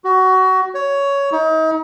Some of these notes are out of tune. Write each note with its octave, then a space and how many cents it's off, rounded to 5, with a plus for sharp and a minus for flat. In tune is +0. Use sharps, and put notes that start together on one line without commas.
F#4 +20
C#5 +10
D#4 +40